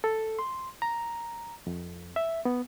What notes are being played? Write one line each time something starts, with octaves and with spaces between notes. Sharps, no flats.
A4
C6
A#5
F2
E5
B3